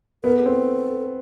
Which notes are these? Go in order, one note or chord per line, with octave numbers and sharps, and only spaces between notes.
B3 A#4
A4
G#4
C4 A4